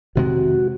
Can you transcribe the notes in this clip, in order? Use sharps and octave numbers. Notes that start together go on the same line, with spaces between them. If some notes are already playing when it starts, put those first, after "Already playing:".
F2 C3 D#3 G#3 F#4